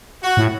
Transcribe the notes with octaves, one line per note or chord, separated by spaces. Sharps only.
F#4
A2